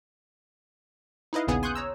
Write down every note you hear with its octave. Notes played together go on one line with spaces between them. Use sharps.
D#4 E4 B4 D#5 F5
A#1 D#2 C#3 B3 G#4 G#5
G#5 C6 C#6 D#6 F#6 G6
C#5 A#5 E6